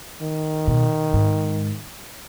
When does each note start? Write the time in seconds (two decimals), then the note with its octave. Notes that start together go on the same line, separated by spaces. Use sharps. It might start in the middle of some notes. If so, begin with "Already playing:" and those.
0.21 D#3
0.68 B2
1.14 G#2